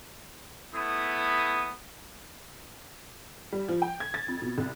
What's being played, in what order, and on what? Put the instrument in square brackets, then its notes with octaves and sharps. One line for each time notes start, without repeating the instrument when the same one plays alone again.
[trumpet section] A3 B3 E4 D#6
[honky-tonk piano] G3
F3
G5
G#6
A6
F2
B2
C2